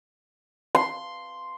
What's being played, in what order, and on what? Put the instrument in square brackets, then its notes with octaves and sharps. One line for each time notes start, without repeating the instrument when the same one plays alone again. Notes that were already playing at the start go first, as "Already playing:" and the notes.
[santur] C6